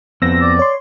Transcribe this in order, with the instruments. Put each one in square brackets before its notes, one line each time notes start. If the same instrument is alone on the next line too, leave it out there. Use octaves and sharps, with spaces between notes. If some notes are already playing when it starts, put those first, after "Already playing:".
[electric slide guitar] F2 B3 C4 [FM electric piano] E6 A#6
[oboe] D5
[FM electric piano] C#5 C6